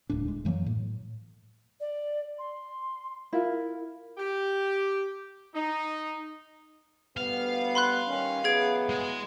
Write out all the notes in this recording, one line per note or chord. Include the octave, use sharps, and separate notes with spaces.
D#1 C#2 A2 D4
G#3
F#2 E3 F#3 A#3
A2
D5
C6
E4 F4 A#4
G4
D#4
D2 G3 B3 F5
B5 C6 F#6
D#3 G3 C#4
E3 F#3 B3 G#4 G#6 D7
G#3